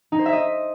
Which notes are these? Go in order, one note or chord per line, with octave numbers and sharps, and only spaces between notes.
D#4
C5
E5
D#5